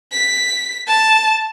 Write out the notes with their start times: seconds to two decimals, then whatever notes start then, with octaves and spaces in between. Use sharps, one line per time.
0.12 B6
0.87 A5